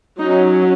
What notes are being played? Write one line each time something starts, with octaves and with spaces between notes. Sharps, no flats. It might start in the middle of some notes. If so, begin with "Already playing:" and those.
F#3 C#4 D#4